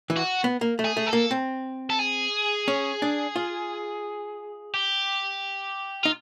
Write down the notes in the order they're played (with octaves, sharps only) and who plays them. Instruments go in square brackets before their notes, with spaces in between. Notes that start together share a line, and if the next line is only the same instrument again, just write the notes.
[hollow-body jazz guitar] E3
[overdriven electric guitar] F#4
[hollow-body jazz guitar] B3
A#3
A3
[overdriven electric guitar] G#4
[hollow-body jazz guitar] A3
[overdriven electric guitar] A4
[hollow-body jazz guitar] A#3
C4
[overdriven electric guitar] A4
G#4
[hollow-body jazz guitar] C#4
D4
F4
[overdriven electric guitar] G4
[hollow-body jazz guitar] D#4 [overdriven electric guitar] F4